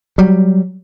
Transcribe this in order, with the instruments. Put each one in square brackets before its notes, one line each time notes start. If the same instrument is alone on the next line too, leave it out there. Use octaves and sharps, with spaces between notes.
[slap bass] F#3 G3